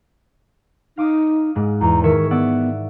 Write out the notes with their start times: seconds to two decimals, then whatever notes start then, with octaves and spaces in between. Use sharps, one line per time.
0.97 D#4 F5 D6 D#6
1.55 G#2 G#3
1.81 E2 A#5
2.04 D#3 A#4 C#5 E5
2.31 B3 D5 F#5 E6